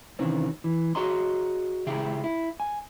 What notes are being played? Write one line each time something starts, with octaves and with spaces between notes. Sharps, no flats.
C3 D#3 E3 C4 C#4
E3
F#4 G#4 C#5 D#5 A#5 C6
C#2 C#3 E4 G4 G#4 G5
E4
G#5